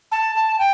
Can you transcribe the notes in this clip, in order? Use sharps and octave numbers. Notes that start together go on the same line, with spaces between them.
A5
A5
G5